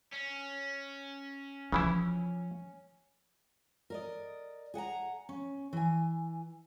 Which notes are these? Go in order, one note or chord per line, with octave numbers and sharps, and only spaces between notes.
C#4
C#3 E3 F3 E4
A#4 D5 D#5
G#4 F#5 G#5 A#5
C#4
E3 G#5